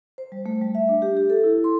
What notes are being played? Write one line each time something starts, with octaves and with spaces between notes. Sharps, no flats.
C5
G3
A3
G3
E5
D4
G4
G4
A4
E4
C6